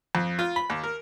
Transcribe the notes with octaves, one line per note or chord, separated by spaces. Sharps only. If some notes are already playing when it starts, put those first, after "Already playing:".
F2
F4
B5
D#2
A#4